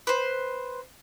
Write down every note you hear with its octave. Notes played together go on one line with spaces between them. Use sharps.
B4 C5